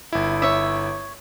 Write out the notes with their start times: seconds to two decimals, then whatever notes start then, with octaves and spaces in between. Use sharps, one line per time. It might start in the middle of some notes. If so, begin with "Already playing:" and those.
0.13 G1 E4
0.42 C#5 E5